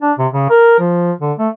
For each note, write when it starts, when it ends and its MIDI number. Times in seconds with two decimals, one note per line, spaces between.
0.02 0.12 62
0.18 0.27 48
0.33 0.46 49
0.49 0.79 70
0.79 1.12 53
1.21 1.33 50
1.39 1.48 57